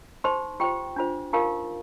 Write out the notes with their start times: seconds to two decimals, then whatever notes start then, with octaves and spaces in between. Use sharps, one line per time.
0.24 D#4 G4 C5 C6
0.60 F4 G4 C5 G5
0.96 D4 F4 C5
1.33 D#4 F4 G4 A#4 F5